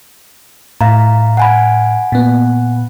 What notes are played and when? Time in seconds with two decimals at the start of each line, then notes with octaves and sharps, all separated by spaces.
0.81 A2 F5 A#5
1.37 F#5 G#5 B5
2.12 A#2 B3